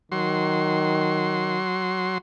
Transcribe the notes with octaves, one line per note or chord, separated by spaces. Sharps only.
D#3 F#3 C6